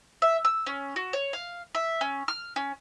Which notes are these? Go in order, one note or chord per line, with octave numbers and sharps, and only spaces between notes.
E5
E6
C#4
F#4
C#5
F5
E5
C#4
F6
C#4